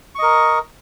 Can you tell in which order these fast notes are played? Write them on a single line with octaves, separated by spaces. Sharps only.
C#6 D#5 A#4